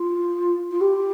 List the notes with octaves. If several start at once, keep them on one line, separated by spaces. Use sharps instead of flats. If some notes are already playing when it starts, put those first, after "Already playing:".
Already playing: F4
F4
G4